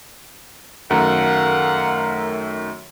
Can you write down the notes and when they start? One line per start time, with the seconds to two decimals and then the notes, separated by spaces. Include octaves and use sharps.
0.91 F#2 D#3 A3 A#4 F5 F#5